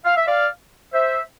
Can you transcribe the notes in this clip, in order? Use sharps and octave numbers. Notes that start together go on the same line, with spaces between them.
F5
E5
D5 F5
C5 E5